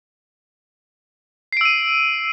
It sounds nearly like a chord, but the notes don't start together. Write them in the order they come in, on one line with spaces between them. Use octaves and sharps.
C7 D7 E6 D#7